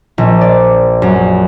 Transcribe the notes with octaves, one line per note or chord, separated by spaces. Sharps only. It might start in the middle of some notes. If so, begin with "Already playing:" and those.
A#1
D5
F#2